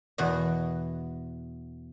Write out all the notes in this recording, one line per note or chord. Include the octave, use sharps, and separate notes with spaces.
E2 B2 D#5